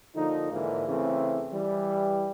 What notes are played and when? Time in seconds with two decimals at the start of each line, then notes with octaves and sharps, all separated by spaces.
0.15 D3 F3 A#3 D#4
0.52 G#2 D3 E3 F3 A#3
0.88 C#3 E3 A3 C4
1.52 E3 G3